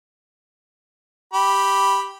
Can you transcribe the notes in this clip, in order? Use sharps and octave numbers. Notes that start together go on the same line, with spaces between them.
G4 B5